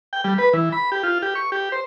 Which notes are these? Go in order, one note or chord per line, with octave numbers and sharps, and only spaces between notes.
G5
G3
B4
E3
B5
G4
F4
G4
C#6
G4
C5